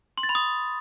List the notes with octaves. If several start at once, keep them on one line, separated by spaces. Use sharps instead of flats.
C6
A6
B5
D#6